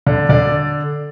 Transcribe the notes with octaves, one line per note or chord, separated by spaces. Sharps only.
D3
D3 D5